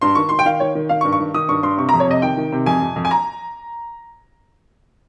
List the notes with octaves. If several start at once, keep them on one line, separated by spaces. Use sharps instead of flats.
G2 C6
D#3 C#6
D#3 C6
G5
D#3 F5
D#3 C#5
D#3
D#3 F5
C#6
G2
C#6
D#3
D#3 D#6
G2 C#6
G2 C6
C3 C#6
A#5
F2
C#5
C3 D#5
D#3 G5
D#3
C3
F2 G#5
F2
F2
G#5
A#5